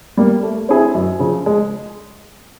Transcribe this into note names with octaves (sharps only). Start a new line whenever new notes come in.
G3 A#3
A3
C4 E4 G#4
F#2
C#3 F3
G#3